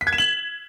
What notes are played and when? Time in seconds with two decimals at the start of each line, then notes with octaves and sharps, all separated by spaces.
0.01 B6
0.07 G#6
0.13 E7
0.18 F#7